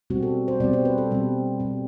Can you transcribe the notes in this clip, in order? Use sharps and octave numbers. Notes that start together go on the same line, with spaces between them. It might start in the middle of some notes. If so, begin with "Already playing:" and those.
B2 G3 C4 F#4
A4
C5
B2 G3 C4 D5
C5
B4
A4
B2 G3 C4
B2 G3 C4